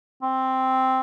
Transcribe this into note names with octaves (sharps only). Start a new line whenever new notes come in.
C4